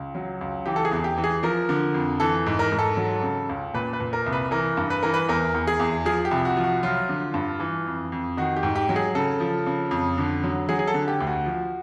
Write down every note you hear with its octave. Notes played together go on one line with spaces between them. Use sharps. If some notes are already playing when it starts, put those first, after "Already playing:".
Already playing: C#2
F#3
C#2
E3 G4
A4
G#4
E2
G4
E3
G#4
F3 A#4
D3
F2
E3 A4
G#2
A#4
G#2
A4
F#3
C#3
C#2
A#2 B4
B4
A#2
A#4
C2
B4
E3 A#4
G2
B4
E3 A#4
B4
E2 A#4
E2
G#4
E2
F3 G#4
G4
C2
F#4
F3
F#4
F#3 F4
D3
G2
E3
F2
F2
D#3 F#4
G4
G#2
G4
F#3
G#4
C#3 A4
F3
C#3
F2
D3
F#3
F#3 G#4
G#4
A4
D3
G4
D2
F#4
F3